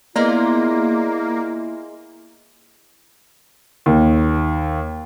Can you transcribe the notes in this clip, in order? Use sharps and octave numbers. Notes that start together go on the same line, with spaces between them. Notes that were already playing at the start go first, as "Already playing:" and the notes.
G#3 A#3 B3 E4 F4 A#4 D5
D#2